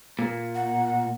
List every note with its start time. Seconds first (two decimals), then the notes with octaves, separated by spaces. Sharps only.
0.19 A#2
0.55 F#5